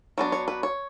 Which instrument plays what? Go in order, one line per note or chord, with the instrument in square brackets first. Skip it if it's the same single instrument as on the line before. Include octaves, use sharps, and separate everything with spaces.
[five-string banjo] F#3 B3 D4
C#5
B4
C#5